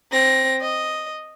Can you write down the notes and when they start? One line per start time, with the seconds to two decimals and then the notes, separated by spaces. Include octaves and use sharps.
0.12 C4 A#6
0.62 D#5